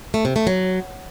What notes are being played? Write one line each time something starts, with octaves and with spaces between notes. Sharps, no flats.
A3
C3
A3
F#3